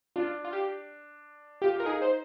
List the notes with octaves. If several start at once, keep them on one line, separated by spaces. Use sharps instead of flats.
D4 F4
F4
G4
F4 G4
F4 A#4
D#4 G#4
C5